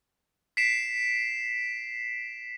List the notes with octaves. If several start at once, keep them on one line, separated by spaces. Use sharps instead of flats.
B6 C7 D7 E7